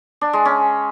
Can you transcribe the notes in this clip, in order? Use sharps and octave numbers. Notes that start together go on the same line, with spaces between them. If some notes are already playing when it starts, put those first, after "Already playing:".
D4
G#3
C#4